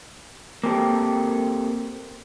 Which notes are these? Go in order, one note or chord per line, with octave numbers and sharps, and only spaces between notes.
A#3 C4 G4 A4